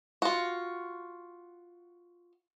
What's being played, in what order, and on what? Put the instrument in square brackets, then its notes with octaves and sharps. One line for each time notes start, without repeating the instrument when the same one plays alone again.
[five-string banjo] F4 F#4